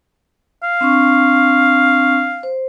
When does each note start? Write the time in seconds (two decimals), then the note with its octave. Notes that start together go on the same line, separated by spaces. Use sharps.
0.63 F5
0.81 C4 D4 C#6
2.43 C5